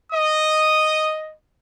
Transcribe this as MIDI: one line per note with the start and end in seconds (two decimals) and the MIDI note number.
0.12 1.33 75
0.12 1.18 87